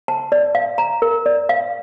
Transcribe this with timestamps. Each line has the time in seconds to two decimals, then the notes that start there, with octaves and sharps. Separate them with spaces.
0.08 A5
0.32 D5
0.55 F5
0.78 A#5
1.02 A#4
1.26 D5
1.49 F5